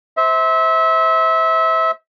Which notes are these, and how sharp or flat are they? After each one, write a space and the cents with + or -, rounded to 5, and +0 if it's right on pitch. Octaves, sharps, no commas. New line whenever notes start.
C5 +0 E5 -25